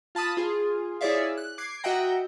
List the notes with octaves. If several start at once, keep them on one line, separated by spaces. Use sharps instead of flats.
F4 A5 B5 D#6
F4 G#4
E4 G#4 C#5 D5 E5 F5
F#6
D6 G#6 C7 D7
F#4 D#5 E5 F#5 G5 A#5